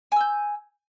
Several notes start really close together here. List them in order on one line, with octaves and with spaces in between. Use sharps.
G#5 E6 G6